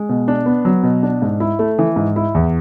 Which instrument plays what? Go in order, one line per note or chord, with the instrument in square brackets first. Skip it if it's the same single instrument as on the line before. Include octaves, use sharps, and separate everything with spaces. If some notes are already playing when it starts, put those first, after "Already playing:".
Already playing: [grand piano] G#3
B2
D4
B3
F#3
B2
D4
G#2
E4
A3
E3
G#2
E4
E2